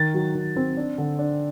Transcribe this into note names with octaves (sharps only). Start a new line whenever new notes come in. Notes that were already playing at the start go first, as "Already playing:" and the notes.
Already playing: D#3 A6
F#3
D#3
C4
D4
D3
D4